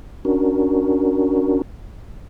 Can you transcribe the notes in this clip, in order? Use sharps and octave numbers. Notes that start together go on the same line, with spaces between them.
C#4 D4 F#4 A#4